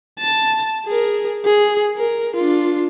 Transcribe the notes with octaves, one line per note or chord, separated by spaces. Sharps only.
A5
G#4 A#4
G#4
A#4
D4 F4